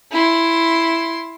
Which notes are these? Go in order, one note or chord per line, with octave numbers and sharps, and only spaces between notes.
E4 C6